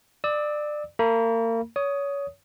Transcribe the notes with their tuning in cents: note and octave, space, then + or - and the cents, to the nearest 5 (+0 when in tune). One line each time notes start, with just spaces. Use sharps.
D5 +20 E6 -30
A#3 -35 B5 -40
C#5 +25 D#6 +0